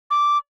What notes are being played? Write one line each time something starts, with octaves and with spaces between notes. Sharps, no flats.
D6